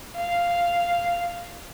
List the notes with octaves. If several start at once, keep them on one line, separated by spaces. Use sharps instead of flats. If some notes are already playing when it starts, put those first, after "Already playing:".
F5